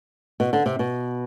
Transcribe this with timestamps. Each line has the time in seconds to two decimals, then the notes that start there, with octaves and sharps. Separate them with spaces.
0.40 B2
0.53 D3
0.66 C3
0.79 B2